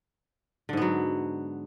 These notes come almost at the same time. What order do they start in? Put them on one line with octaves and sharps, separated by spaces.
D3 G#2 B3 F#3